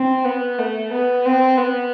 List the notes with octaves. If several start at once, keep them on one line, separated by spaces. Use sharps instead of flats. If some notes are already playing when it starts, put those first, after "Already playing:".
Already playing: C4
B3
A3
B3
C4
B3